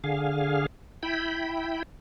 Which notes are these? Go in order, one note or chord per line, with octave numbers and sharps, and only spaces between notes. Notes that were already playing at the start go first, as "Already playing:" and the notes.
D3 G#4 F5
E4 G5 B5